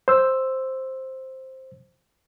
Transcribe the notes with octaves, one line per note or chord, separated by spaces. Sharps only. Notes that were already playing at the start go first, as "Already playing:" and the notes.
C5 E6